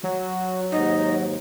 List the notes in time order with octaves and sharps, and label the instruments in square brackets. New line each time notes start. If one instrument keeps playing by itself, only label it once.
[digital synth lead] F#3 [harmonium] F#4
[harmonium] D#2 G#2 [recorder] D#4